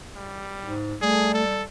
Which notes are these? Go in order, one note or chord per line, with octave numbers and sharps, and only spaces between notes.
G3
G#2
G3 A3 G#4
A4